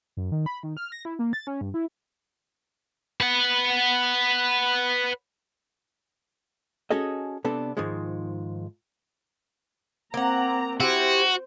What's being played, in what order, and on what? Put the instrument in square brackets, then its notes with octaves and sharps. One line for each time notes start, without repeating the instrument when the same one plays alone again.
[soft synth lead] F#2
D#3
B5
D#3
F6
A#6
E4
A#3
A6
C#4
G2
E4
[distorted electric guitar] B4 F#5
[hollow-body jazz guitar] C#4 F#4 G#4 A4 D#5
C3 B3 D4 A4
G#2 D#3 F3 G#3
[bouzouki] A#3 F#5 [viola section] C4 A#5
[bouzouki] E4 G4 [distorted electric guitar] F#4 [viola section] C5